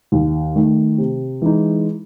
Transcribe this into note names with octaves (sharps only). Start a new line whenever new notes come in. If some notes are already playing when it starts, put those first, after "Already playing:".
D#2
D#3 A3
C3
E3 G#3 D#4